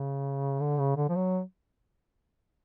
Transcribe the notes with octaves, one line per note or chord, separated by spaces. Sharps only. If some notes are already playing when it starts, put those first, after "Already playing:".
Already playing: C#3
D3
C#3
D3
F3
F#3